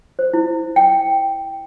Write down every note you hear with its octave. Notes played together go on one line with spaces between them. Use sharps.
C5
E4
G5